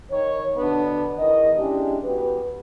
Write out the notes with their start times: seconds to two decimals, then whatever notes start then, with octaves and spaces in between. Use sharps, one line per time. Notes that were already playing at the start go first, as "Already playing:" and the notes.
0.10 D#3 C#5
0.57 B2 D3 B3 D4
1.17 E2 D#3 D#5
1.57 G#3 C#4 D4 E4 G4 G#4
2.04 E2 F#4 G4 B4